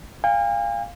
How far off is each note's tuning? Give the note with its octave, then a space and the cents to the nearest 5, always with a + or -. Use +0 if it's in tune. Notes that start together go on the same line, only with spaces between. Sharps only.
F5 +0 G#5 -45